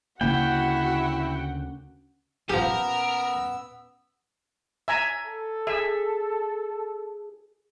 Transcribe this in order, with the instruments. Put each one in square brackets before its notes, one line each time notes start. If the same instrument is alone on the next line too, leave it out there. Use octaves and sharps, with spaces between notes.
[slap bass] D2 C#3 A#3 [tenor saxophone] E4 [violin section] F#4 F#5 [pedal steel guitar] G5
[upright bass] A#2 C#4 [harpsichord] F3 G4 [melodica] B3 E6 [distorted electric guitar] A#4
[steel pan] E5 G#5 A#5
[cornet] A4
[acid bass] G#4 [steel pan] E5